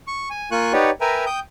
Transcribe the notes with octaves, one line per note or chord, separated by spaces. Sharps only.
C#6
G#5
A#3 F4 G#5 C#6 F#6
D#4 G4 B4 C#5 D5 F#5
A#4 B4 E5 G5 G#5 A#5
G5 D#6 G6